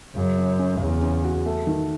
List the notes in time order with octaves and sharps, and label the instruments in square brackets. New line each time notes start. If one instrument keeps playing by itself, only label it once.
[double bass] F#2 [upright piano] C#3
[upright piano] C#3
C#4
[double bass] E2 [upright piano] C#3
[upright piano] C#4
F#4
A3
D#3